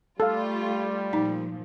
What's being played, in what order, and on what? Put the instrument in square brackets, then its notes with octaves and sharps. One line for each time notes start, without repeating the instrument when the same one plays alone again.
[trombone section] G3 [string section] A3 F4 [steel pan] A4 F5
[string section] A#2 F3 [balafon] D#4